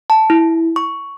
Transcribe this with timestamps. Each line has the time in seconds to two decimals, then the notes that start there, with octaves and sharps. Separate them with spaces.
0.10 A5
0.30 E4
0.76 C#6